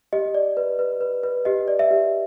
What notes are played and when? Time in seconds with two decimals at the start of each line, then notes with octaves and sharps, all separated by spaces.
0.13 G4 D#5
0.35 D5
0.57 B4
0.79 B4
1.01 B4
1.23 B4
1.45 G4 D#5
1.68 D5
1.79 E5
1.91 G4